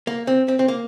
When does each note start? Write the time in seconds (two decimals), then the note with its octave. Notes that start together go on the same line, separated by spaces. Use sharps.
0.07 A#3
0.27 C4
0.48 C4
0.59 C4
0.68 A#3